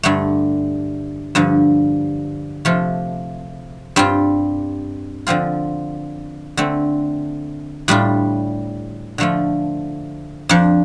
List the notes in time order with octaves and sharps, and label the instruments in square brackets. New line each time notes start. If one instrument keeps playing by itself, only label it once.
[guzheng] G2 D3 A3
G2 D3 F3
C3 F3 A3 F4
G2 G3 C4 F4
D3 F3 C4 F4
D3 A3 C4
A2 G3 D4 F4
D3 F3 A3 F4
F2 F3 D4